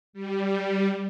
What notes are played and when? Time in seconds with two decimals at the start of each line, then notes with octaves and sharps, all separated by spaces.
0.13 G3